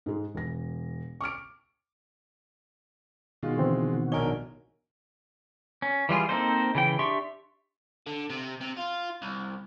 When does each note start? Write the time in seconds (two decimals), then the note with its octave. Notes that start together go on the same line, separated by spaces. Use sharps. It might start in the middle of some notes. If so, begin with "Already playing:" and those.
0.06 G#2 G#3
0.35 E1 A#6
1.21 C#6 D6 F6 D7
3.43 B2 D#3 G#3 F4 F#4
3.57 D3 E3 C4
4.12 A#1 A#4 C#5 D#5 G#5 G7
5.82 C#4
6.09 E3 G3 F4 G#4
6.29 A#3 C4 D#4 A4 C5
6.75 C#3 E3 G5
6.99 D4 G4 E5 C6 C#6
8.07 D3
8.30 C3
8.61 C3
8.77 F4
9.22 C2